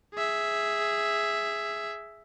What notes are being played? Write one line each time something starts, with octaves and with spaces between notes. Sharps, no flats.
G#4 E5